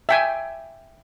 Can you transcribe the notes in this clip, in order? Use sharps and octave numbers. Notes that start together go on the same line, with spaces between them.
E5 G5 G#5